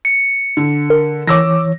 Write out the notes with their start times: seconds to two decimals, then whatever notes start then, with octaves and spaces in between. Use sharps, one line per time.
0.05 C#7
0.57 D3
0.90 A#4
1.27 E3 C#5 D6 E6 A#6